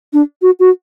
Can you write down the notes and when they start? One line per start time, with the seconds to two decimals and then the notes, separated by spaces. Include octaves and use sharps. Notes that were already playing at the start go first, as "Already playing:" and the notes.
0.13 D4
0.42 F#4
0.60 F#4